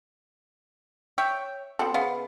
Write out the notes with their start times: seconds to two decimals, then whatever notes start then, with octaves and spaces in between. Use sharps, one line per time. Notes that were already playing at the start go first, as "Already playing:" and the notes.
1.18 C#5 E5 G5
1.79 B3 C4 F#4 A4
1.94 C#3 B3 E5 F5